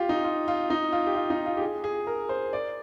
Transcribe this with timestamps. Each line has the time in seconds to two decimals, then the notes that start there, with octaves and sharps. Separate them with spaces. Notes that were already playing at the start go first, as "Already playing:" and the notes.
Already playing: F4 G4
0.09 D#4
0.24 F4
0.48 F4
0.70 D#4
0.92 F4
1.07 G4
1.15 F4
1.30 D#4
1.46 F4
1.57 G4
1.61 G#4
1.84 G#4
2.07 A#4
2.29 C5
2.53 D5